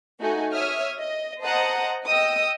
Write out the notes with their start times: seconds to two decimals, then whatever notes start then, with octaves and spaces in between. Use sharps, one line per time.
0.19 A3 D#4 F#4 G#5
0.53 C#5 E5 D#6 F6
0.98 D#5
1.42 C5 D#5 F#5 A5 A#5 D#6
2.04 D#5 G5 D#6 E6